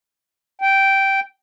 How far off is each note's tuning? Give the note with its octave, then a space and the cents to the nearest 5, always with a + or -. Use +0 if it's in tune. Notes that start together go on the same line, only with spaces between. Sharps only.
G5 -10